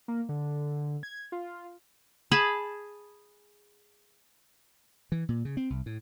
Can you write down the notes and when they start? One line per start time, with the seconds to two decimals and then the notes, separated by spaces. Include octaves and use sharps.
0.08 A#3
0.29 D3
1.03 G#6
1.32 F4
2.31 G#4 A5 B5
5.12 E3
5.29 A#2
5.45 C#3
5.57 C4
5.70 C2
5.86 A2